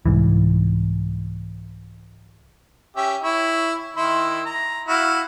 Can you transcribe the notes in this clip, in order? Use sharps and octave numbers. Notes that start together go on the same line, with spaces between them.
C2 G#2 E3
C#4 G4 E5
E4 C#5
D#3 E4 C6
A#5
E4 F#4 F5